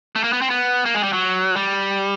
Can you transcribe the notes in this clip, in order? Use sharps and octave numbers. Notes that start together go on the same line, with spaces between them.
A3
A#3
B3
C4
B3
A#3
G#3
G3
F#3
G3